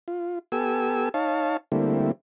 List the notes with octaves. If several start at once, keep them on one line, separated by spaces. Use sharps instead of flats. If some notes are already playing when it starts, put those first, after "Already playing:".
F4
B3 G4 A4 G#5 E6
D#4 C#5 F5 A5
D3 G3 A3 A#3 C4 E4